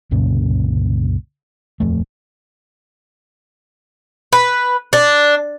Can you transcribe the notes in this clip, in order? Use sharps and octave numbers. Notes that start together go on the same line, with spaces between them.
C2 F#2 A#2 C#3
D#1 F2 A3
B4
D4